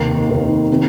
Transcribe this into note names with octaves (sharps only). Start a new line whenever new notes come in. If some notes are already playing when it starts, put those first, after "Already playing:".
Already playing: F1 D#2 D#3 A#3
F1 D#2 D#3 A#3
C3 D#3